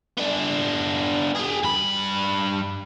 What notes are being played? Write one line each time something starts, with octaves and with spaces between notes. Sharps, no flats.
B3 D4
G4 G#4
G2 B5